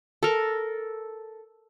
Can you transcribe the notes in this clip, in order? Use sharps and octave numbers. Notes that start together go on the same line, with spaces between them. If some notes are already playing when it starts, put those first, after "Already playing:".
A4 A#4